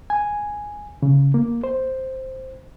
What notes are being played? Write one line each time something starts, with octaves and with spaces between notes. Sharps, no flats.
G#5
C#3
A#3
C5